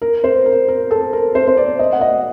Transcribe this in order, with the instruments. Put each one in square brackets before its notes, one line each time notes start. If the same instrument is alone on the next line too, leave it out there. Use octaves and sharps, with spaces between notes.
[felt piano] A#4
C5
A#4
A#4
A4
A#4
C5
C5
D5
D#5
F#5
D#5